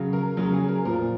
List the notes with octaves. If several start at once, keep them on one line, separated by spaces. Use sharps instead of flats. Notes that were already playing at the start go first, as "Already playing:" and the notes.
Already playing: C#3 F#3
A#4
C#3 F#3 A#4
G#4
A#4
A#2 F3 A#4